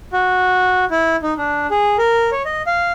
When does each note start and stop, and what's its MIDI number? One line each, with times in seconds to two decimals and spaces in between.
0.13 0.85 66
0.91 1.16 64
1.23 1.34 63
1.38 1.67 62
1.71 1.97 68
1.98 2.30 70
2.32 2.42 73
2.45 2.62 75
2.67 2.92 77